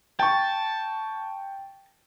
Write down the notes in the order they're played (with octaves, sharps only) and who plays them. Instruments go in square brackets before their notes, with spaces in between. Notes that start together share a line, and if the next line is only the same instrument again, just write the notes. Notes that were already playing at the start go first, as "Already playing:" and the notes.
[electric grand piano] G5 C#6 [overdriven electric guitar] A5